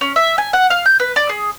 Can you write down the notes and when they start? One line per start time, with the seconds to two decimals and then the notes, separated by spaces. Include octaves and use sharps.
0.01 C#4
0.16 E5
0.38 G#5
0.53 F#5
0.70 F5
0.85 G6
1.00 B4
1.16 D5
1.29 G#4